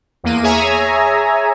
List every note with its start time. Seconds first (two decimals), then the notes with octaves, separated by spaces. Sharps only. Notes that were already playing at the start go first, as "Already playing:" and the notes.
0.24 E2 A#3 D#7
0.43 G#4 C#5 E5 G#5 A#5